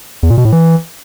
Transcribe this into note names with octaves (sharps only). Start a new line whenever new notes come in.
E2
A#2
B2
A2
E3